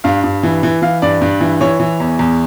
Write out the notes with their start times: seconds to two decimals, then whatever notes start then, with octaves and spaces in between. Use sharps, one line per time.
0.04 G2 F5
0.24 G2
0.43 E3
0.63 E3
0.82 E3 F5
1.02 G2 D5
1.21 G2
1.41 E3
1.61 E3 C#5
1.80 E3
2.00 E2
2.19 E2